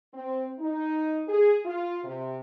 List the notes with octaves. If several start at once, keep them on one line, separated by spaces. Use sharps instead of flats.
C4
D#4
G#4
F4
C3